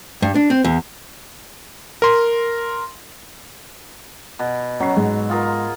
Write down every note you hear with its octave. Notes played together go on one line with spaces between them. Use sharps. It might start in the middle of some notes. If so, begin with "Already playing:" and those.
G2
D4
C4
E2
A#4 C6
B2
F#3 C#4 C7
G#2
F4 G#4 A#4